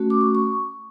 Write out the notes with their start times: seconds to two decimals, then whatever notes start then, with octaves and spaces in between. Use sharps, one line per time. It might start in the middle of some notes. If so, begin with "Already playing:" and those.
Already playing: A3 C#4 F#4
0.10 D6
0.21 C#6
0.35 C#6